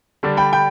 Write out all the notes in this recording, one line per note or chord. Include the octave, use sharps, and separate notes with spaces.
D3 G3 D4
G5 B5
G5 B5